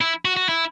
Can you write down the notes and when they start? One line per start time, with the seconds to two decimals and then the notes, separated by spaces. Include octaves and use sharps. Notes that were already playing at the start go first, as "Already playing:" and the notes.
0.01 E4
0.25 F#4
0.37 F#4
0.49 E4